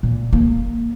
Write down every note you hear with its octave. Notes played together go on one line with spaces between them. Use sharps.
A#2
A#3